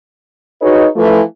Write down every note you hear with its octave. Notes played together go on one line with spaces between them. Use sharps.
D#4 F#4 G#4 B4 C#5 D#5
E3 F3 A3